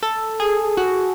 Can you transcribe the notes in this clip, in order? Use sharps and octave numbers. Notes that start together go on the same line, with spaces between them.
A4
G#4
F#4